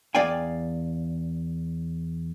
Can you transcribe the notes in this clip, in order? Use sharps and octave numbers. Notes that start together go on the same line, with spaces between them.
E2 D5 F5 G5 G#5